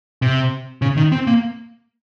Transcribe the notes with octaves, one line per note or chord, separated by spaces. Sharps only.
C3
C#3
D#3
C4
A#3